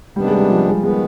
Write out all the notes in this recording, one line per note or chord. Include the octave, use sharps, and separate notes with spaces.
C3 D#3 G3 B3 D4
G#3
G3
F3
G#3
D#3 G#3 B3